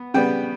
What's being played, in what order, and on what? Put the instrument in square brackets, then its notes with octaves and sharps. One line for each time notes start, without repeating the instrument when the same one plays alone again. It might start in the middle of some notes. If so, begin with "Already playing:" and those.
Already playing: [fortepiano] B3
C#3 G3 B3 G5